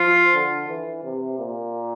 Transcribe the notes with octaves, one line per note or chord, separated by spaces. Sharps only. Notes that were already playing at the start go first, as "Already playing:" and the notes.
Already playing: F3 F4
D3
E3
C3
A#2